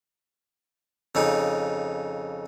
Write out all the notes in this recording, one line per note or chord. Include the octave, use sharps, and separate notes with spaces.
F2 C#3 D#4